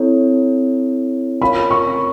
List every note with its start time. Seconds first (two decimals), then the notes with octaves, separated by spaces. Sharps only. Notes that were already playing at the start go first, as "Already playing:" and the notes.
Already playing: C4 E4 A4 C#5
1.42 C#4 F4 A#4 C#5 F5 B5
1.71 C#6